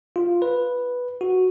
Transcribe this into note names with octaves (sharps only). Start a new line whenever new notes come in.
F4
B4
F#4